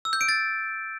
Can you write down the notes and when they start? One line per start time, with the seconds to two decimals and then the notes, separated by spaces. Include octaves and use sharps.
0.05 E6
0.13 G6
0.21 D7
0.29 A6